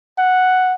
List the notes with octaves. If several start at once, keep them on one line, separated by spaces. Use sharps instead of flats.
F#5